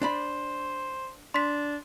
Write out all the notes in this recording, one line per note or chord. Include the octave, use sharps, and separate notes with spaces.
D4 C5 D5 B5
D4 C6 B6